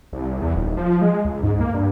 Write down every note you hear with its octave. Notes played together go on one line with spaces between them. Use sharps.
C2
E2
D#1
F3
G#3
C#2
G#2
A#3
G2